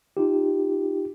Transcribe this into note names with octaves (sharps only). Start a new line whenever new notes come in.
D#4 F4 G4